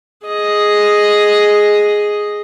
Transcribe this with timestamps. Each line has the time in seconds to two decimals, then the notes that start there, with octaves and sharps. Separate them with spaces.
0.25 G#4 D#5